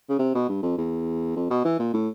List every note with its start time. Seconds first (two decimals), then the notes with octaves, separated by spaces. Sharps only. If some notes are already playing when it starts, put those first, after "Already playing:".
0.09 C#3
0.19 C3
0.35 B2
0.49 G2
0.63 F2
0.78 E2
1.36 F2
1.50 B2
1.65 E3
1.79 A#2
1.93 A2